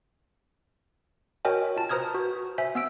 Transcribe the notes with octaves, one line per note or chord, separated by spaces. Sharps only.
F#4 A#4 C#5 D#5 G5 G#5
F4 A5
B4 C5 A#5 D#6 F6 G#6
F#4
C5 E5 G#5
B3 E6 D7